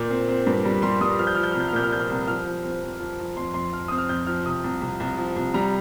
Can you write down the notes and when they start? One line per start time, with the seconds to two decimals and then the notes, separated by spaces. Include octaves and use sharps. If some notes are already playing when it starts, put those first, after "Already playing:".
Already playing: A#2 G6
0.10 C4
0.28 C4
0.46 G2
0.65 G3
0.82 G3 C6
1.01 G3 D#6
1.18 F3 F6
1.27 G6
1.35 F3 F6
1.43 G6
1.51 F6
1.55 C2
1.60 G6
1.68 F6
1.73 A#2 G6
1.83 F6
1.92 F3 G6
1.99 F6
2.10 C2
2.28 F3 F6
2.46 F3
2.64 C4
2.82 F2
3.00 F3
3.19 F3
3.37 F2 C6
3.54 F2 C6
3.72 F3 F6
3.88 C4 D#6
3.98 F6
4.09 F2 G6
4.26 F3 F6
4.45 C3 D#6
4.64 C2
4.81 C2
5.00 C2
5.17 F3
5.36 C2
5.54 G3 A#5